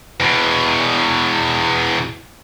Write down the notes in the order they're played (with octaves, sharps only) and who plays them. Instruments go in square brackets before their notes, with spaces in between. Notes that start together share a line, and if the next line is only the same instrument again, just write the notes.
[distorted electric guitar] E2 B2